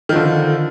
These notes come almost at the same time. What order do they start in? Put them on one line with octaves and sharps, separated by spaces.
D#3 F3 D3